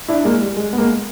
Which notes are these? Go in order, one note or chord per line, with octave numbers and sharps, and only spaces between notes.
D4 E4
G#3 A#3
G3
G#3
B3
G#3 A#3